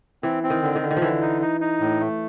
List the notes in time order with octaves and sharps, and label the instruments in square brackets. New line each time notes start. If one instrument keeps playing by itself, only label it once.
[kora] E3 [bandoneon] C4
[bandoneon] C4
[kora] D#3
[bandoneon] D3
[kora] D#3
[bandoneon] D3
[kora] D#3
F3
[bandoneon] D3 [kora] E3
[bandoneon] D#4
D#4
D#4
A2
A3